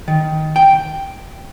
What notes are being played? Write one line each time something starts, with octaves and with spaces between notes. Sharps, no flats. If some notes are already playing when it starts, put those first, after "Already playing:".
D#3
G5